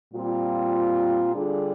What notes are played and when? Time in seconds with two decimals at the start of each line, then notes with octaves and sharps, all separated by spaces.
0.13 A#2 G3 C4 F4
1.34 D3 G3 D4 F4 G#4